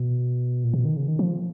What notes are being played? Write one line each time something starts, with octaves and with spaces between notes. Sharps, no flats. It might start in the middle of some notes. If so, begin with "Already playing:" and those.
Already playing: B2
A#2
B2
D#3
C#3
D#3
F3